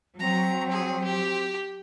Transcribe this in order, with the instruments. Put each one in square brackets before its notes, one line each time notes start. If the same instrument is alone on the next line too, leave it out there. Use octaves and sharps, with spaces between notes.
[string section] F#3 [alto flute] C4 [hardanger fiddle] A#5
[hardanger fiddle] G#4
G4